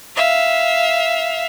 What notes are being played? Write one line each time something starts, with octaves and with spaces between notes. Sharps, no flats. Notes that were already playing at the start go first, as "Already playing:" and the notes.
E5 F5